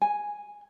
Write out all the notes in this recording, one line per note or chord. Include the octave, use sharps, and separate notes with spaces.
G#5